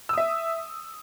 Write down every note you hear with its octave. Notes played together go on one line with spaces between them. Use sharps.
E5 D#6 E6